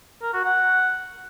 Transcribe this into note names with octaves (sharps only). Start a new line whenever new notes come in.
A#4
F#4
F#5